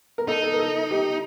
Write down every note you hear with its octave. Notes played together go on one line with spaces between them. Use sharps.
A#4
D#4 A4
A4
A#4
A4
G4